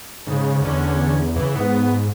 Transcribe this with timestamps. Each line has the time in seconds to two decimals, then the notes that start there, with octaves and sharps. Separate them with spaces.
0.27 G#2 C#3
0.62 E2 D3 C#4
1.36 C#3 E3
1.55 G#2 B3